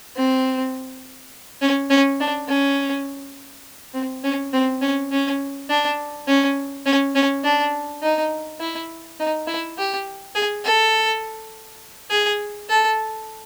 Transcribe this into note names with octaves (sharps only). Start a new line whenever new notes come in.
C4
C#4
C#4
D4
C#4
C4
C#4
C4
C#4
C#4
D4
C#4
C#4
C#4
D4
D#4
E4
D#4
E4
G4
G#4
A4
G#4
A4